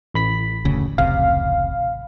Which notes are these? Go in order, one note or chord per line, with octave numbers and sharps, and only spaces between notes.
A1 B5 B6
F1 D2 C#3
F1 C#2 C3 F5